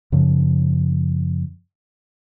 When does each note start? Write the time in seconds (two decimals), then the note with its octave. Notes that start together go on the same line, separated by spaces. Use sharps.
0.12 F#2 C#3 F3